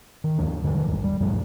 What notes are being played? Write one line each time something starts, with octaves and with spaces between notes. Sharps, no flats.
D#3
D#2 F3 D4
D3 D#3 F3 G3
A1 D#2 B3 D4
G3
F#2 A#2 F3 A3